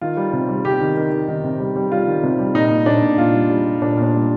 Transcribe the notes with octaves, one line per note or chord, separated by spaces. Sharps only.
D#3 F4
G3
C3
G3
C3 G4
D#3
D#3
D#3
D#3
C3
G3
G3
G3 F4
D#3
C3
G3
A#2 D#4
A#2
A#2 D4
A#2
A#2 F4
G3
G3
G3
A#2 D4
A#2
D4
G3